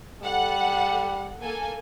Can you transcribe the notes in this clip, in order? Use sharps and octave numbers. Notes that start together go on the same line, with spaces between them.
G3 A4 F#5
A#3 A4 G#5